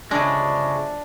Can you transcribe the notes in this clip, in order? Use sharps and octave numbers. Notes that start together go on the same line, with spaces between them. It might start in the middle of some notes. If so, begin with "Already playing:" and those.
G1 C#3 F3 G#3 D4 E5